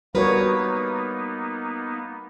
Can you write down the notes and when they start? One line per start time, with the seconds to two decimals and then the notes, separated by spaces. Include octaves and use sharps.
0.15 G3 A#3 B3 D#4 F#4 A#4 B4 C#5